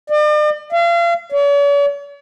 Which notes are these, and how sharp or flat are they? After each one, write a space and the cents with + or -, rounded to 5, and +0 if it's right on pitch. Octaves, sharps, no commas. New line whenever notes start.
D5 +45
F5 -35
C#5 +45